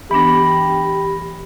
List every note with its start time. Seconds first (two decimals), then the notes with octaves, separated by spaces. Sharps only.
0.11 E3 B3 D4 G4 B5 A#6